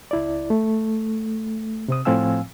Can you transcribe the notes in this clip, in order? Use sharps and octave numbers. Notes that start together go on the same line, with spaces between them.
C#2 E4 D5
A3
C3 C4 D#6
A2 F3 C4 F5 G#5 E6